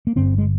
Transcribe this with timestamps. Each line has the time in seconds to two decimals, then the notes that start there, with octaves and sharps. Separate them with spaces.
0.07 A#3
0.16 G1 G2 D3 C4
0.38 G#3